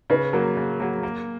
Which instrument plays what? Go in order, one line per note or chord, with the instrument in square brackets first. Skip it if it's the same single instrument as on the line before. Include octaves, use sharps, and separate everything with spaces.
[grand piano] C#3 [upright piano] B4
[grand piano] F#3 A#3 [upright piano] A#4
[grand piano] C#3
F#3 A#3
A#3